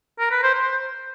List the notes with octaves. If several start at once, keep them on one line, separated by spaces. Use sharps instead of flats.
A#4
B4
C5
C5